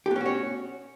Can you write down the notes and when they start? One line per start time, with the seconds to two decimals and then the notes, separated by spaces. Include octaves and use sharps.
0.06 G4
0.11 B3
0.16 C#4
0.21 F#4
0.26 C#5